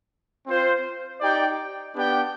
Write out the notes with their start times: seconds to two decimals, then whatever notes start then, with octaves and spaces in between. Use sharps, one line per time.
0.47 C4 F4 C5
1.21 D#4 G4 D5 G5
1.95 B3 D4 G4 D5 G5